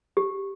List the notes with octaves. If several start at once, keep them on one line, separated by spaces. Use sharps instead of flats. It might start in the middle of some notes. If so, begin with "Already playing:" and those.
G4